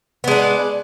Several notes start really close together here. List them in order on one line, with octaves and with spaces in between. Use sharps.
B3 G#3 D4